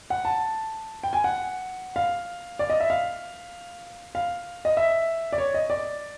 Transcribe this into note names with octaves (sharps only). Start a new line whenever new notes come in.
F#5
A5
G5
G#5
F#5
F5
D5
D#5
E5
F5
F5
D#5
E5
D5
C#5
D#5
D5